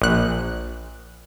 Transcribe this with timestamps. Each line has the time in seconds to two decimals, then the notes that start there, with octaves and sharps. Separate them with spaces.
0.02 A#1 F#6